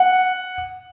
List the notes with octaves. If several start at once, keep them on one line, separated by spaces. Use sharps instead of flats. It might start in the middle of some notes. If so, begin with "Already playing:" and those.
Already playing: F#5